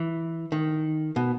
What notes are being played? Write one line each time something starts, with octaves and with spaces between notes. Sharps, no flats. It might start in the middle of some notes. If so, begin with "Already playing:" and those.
Already playing: E3
D#3
B2